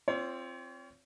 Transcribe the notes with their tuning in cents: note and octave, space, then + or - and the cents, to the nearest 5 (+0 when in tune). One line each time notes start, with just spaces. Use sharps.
C4 +5 F4 -20 C#5 +40